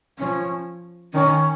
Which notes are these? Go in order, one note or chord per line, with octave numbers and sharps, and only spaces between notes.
F3 C#4
D#3 C#4